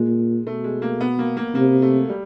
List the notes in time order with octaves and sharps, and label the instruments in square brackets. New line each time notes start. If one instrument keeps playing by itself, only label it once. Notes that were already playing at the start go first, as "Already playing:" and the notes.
Already playing: [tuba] A#2 [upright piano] G#3
[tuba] B2 [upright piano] A3
[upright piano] G#3
A#3
B3
A#3
A#3
[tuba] C3 [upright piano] A#3
[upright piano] A3
G3